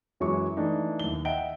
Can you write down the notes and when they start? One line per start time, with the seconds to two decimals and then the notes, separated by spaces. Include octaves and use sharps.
0.20 F#2 E3 F#3 G#3 C#6 D6
0.57 E3 A3 D4 D#4
1.00 D#2 G7
1.25 D#5 E5 F#5 G5 D7 G7